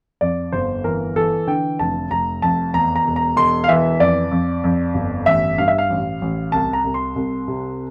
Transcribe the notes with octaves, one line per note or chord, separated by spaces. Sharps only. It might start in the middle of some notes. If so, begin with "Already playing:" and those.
F2 D5
G1 C5
E3 A#4
E3 A4
D3 G5
F1 A5
F1 A#5
F2 A5
E2 A#5
A#5
E1
A#5
E1 C6
F5
E3 E5
F2 D5
F2
F2
G1
A1 E5
G2 F5
E5
F5
A1
A1
C2 A5
A#5
C2
C6
C2
C3